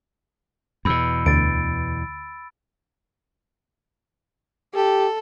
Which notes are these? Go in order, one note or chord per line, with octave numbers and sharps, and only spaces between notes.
E2 B2 B5 E6
D2 A6 D7
G4 A4